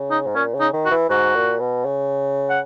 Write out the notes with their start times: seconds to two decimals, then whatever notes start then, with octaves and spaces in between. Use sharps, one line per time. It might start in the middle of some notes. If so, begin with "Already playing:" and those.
Already playing: C#3
0.11 D#4
0.27 G#2
0.35 A#2 C#4
0.54 C#3
0.60 D#4
0.73 D#3
0.86 F#4
0.91 E3
1.10 G#2 F#4
1.35 A#2
1.60 B2
1.85 C#3
2.50 F#5